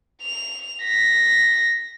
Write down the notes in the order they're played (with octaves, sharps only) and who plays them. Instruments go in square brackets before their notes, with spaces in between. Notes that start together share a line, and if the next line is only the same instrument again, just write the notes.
[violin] F7
A#6 B6